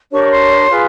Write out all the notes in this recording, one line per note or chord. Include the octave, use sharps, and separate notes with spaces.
D4 G4 A#4 C#5 C#6
D6
C#6
C6
F4 G#4 B4